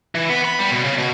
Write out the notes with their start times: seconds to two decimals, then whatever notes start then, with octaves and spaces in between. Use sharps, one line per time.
0.15 E3
0.30 B3
0.45 B5
0.60 G3
0.72 B2
0.85 C#3
0.98 B2